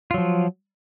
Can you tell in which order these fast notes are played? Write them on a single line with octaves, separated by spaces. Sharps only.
F4 F#3 F3